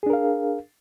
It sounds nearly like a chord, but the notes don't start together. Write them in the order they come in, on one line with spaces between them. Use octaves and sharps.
G#4 D4 A#4 F5